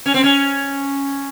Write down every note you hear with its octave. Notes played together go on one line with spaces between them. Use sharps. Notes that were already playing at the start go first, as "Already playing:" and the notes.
C#4
C4
C#4